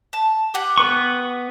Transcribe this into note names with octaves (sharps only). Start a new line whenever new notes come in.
A5
G4 F#5 G6
B3 B4 C#6